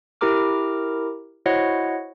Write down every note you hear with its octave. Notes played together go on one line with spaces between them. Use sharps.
E4 G4 A#4 A#5 D6 F6
E4 F#4 C5 C#5 D#5 F#5